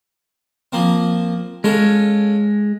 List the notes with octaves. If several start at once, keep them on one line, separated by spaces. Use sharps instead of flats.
F3 A#3 C4
G#3 C#4 F4 A4